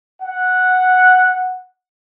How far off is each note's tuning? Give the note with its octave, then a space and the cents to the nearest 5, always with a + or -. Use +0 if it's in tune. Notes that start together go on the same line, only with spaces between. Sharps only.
F#5 -5